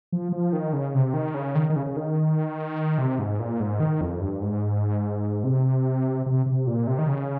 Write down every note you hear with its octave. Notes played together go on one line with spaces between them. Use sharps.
F3
F3
D#3
C#3
C3
D#3
C#3
D#3
D#3
C#3
C#3
D#3
C3
G#2
A#2
G#2
D#3
F2
G2
G#2
C3
C3
C3
A#2
C3
D#3
C#3